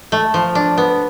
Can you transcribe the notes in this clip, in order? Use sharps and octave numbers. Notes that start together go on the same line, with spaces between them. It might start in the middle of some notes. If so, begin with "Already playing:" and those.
A3
F3
D4
B3